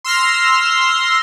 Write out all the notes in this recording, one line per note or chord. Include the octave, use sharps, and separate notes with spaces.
C6 E6 F6 A#6 C7